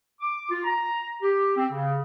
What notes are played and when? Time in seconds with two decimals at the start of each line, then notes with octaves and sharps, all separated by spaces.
0.21 D6
0.50 F4
0.64 A#5
1.23 G4
1.57 C4
1.71 C#3